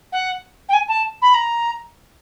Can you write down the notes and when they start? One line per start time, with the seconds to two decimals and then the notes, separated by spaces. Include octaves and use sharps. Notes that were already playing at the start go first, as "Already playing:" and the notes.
0.12 F#5
0.68 G5
0.73 G#5
0.88 A5
1.21 B5
1.34 A#5